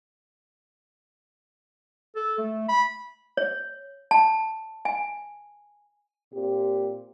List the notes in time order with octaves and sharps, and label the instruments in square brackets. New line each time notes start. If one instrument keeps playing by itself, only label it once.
[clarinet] A4
A3
B5
[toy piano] C#5
A5
G#5
[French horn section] A#2 C4 G4